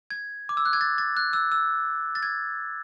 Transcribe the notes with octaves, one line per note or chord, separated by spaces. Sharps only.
G#6
D6
E6
F#6
G#6
A6
A6
F#6
E6
E6
A6
G#6